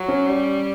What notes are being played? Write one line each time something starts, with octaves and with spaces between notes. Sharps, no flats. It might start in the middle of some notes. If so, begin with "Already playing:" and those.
Already playing: F#3
C#4
G3